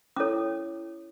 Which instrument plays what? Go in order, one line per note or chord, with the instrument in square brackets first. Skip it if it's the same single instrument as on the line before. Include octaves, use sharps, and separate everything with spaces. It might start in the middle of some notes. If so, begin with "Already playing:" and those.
[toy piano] C#4 E4 A4 C#5 D6